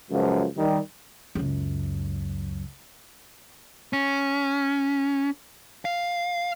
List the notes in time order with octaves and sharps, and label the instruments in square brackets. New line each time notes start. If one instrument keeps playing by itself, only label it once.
[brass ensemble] C#2 F#2 F3
D#3 G3
[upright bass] C#2 F#2
[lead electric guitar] C#4
F5